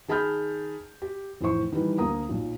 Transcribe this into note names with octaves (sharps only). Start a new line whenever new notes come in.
D#3 G#4 A5 B5 F6 G6
G4
F1 A2 E3 C5 C#6
D#3 E3 G3 B4
D2 A#3 A#4 A#5 D#6
B1 A#2